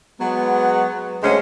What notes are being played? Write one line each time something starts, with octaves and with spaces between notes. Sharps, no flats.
F#3 G#3 B3
D2 G#3 C#4 G#4 C5